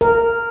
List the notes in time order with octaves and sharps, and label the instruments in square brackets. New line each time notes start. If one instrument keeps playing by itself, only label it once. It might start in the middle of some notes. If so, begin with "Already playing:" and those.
[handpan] A#4